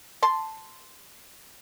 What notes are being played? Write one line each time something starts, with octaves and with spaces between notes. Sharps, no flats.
A5 C6